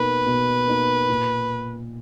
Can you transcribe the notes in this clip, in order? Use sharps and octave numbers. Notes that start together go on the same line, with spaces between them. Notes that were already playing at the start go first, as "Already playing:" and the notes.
Already playing: B2 A#3 D#4 A#4 B4
B2
A#3 D#4 A#4
A#2